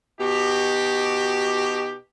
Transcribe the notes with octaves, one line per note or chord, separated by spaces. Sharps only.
B2 D#4 F#4 G4